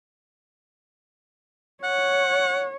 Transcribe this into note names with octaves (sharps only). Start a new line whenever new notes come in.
C#5 F#5